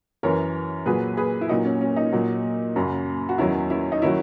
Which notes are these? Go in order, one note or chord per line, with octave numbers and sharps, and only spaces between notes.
F#2 E3 A#4 C#5
A#2 F#3 G#4 B4
G#4 B4
E4
A#2 F#3 D#4
C#4
C#4
D#4
A#2 F#3
F#2 C#3 F#3
F#4
E2 D#3 F#3 C#4 E4
C#4 E4
D#4
D#3 F#3 C#4 E4